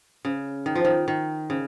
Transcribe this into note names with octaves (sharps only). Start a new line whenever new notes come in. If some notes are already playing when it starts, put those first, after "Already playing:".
C#3
D#3
F3
D#3
D#3
C#3